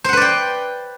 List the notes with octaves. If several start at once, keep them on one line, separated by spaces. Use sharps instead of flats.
B4 C5 D5 F#5 G5